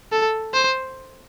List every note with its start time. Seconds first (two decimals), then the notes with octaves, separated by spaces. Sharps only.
0.12 A4
0.54 C5